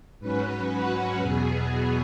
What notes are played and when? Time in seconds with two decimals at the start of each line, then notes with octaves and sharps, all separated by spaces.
0.19 G#2 F#3 C#4 B4
0.70 F#4
1.19 E2 B2 F#3 B3 G#4